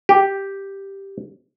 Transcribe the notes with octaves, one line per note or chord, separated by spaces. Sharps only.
G4